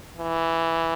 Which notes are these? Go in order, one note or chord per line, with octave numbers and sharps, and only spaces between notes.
E3